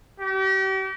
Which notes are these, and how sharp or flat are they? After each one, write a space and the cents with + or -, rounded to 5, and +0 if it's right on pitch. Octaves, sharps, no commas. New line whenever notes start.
G4 -40